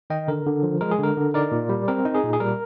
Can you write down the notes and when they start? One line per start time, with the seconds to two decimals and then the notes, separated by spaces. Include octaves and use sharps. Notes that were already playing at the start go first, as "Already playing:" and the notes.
0.10 D#3 D#5 G5
0.28 D3 A#4
0.46 D3
0.63 F3
0.81 G#3 A#4
0.91 G#4
0.99 D3 A#4
1.17 D3
1.34 D#4 A#4 D5
1.52 A#2
1.69 G3
1.88 C4 A#4
2.05 D#4
2.15 G#4
2.24 A#2
2.33 G#4
2.40 G3 A#4